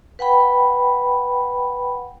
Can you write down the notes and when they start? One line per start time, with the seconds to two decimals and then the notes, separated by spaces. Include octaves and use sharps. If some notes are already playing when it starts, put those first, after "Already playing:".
0.19 B4 F#5 G5 B5